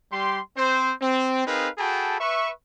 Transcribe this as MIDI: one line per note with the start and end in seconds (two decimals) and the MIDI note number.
0.12 0.40 55
0.12 0.40 67
0.12 0.40 84
0.57 0.94 60
0.57 0.94 72
1.01 1.43 60
1.47 1.69 60
1.47 1.69 63
1.47 1.69 68
1.47 1.69 70
1.47 1.69 71
1.47 1.69 77
1.78 2.17 66
1.78 2.17 68
1.78 2.17 69
1.78 2.17 79
1.78 2.17 81
1.78 2.17 83
2.20 2.51 71
2.20 2.51 76
2.20 2.51 85